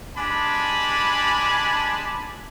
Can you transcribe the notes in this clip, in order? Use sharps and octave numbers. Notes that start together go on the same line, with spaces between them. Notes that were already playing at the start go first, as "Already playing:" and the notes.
G#3 D4 G4 G#5 A5 B5